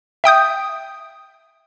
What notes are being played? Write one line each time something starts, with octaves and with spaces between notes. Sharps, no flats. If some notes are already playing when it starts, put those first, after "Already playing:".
E5 G5 D#6 G6